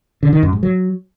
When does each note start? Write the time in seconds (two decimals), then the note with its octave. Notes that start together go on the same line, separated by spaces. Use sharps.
0.23 D3
0.33 D#3
0.43 F#2
0.53 G#2
0.63 F#3